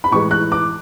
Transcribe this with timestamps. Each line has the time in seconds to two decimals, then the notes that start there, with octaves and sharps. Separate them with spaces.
0.04 B5
0.11 A2 E3 G#3 C#6
0.31 F#6
0.52 D6